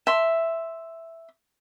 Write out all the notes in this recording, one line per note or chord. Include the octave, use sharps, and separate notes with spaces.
E5 C6